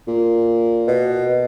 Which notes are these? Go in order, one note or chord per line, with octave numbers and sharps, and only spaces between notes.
A#2
B2